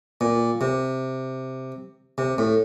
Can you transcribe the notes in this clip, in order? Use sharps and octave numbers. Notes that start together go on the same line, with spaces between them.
A#2
C3
C3
A2